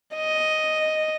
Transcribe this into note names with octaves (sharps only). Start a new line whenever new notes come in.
D#5